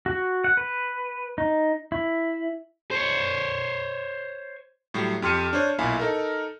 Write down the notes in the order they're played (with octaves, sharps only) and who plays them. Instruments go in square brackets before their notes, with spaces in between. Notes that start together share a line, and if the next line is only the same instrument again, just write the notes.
[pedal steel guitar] F#4
F#5
B4
D#4
E4
[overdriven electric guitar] C5 C#5
[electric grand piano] A2 F#3 G3
F2 G4 C6 F6 C#7 D#7
D4 C5 C#5
B1 A#2 E4 F5 G#5 B5
D#4 A4 A#4